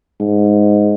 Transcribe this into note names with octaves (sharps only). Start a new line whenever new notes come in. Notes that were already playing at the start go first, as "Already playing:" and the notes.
G#2